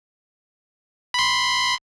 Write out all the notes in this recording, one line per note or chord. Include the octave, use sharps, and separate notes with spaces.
B5 C6